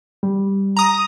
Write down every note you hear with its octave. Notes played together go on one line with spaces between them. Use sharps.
G3
A#5 D#6